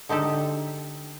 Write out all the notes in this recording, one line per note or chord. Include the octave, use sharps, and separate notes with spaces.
D3 D#4 G4 A4